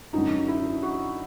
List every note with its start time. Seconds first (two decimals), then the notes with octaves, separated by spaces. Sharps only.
0.13 F#2 D3 F#3 D#4
0.48 E4
0.83 F#4